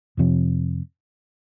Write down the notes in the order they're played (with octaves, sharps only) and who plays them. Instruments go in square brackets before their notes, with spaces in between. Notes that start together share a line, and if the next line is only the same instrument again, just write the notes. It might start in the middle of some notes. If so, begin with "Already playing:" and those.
[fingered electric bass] F2 C3 F3 C4